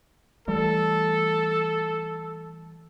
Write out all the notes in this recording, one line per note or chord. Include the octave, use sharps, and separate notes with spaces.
E3 G3 A3 A4